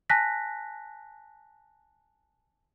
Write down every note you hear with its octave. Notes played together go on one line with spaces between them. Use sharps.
G#5 A5 F#6 A#6 B6